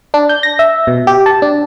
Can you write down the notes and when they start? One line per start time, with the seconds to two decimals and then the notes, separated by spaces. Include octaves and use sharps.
0.14 D4
0.29 G6
0.43 A#6
0.59 E5
0.87 B2
1.07 G4
1.26 A5
1.42 D4